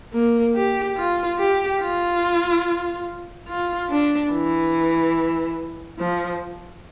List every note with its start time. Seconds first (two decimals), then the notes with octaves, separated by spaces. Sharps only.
0.13 A#3
0.55 G4
0.97 F4
1.39 G4
1.81 F4
3.48 F4
3.90 D4
4.32 E3
5.99 F3